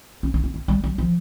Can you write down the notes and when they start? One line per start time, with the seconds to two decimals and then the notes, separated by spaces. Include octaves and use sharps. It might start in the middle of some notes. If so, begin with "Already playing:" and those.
0.23 C#4
0.34 D4
0.44 C#4
0.54 C4
0.68 G3
0.84 F#3
0.98 F3